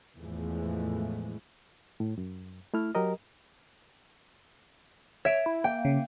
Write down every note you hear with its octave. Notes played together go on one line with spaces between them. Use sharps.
E2 A2 E3 F3 G#3 A3
A2
F#2
A3 E4 F6
F#3 G4 A#4 D#5
C#5 E5 D7
E4
A#3 G5
C#3